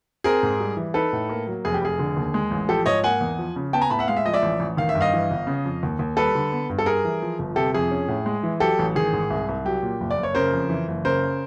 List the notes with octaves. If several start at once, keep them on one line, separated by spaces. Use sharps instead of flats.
C4 G#4 A#4
G#2
G3
E3
D#4 A4 B4
A2
A#3
F#3
F1 G#4
G4
F1 G#4
D3
D#2
G#3
A1
F3 G4 A4
G#2 C#5 D#5
A#3 F#5 G#5
E2
F3
C#3
B3 G5 A5
G#5 A#5
A2 A5 B5
E5 F#5
G#3 F5
E5
F3 D#5
D5 E5
A1
A1
D#3 F5
E5
G2
D#5 F5
E3
G1
C#3
F2
D#2
D#2
G3 A4 B4
D3
B3
G2
A4
G3 G#4 A#4
E3
F3
G1
C3 G4 A4
F2 G#4
C#4
A2
G#3
E3
F#3 G4 A4
A1
D#3 G#4
G#2
C2
C2
F#3 G4
A#2
F#1
D5
F#1
C#5
C#3 A#4 C5
F2
E3
F#1
C#3 A#4 C5